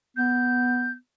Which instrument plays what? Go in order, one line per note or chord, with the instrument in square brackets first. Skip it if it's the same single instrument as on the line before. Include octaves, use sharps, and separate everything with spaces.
[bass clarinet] B3 [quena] G6